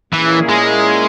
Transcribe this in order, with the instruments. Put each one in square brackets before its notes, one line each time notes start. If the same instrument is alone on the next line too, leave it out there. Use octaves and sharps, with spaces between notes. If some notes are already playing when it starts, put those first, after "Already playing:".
[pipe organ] A#2 A#3 C#4 E4 G#4 [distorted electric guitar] E3
[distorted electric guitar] G#3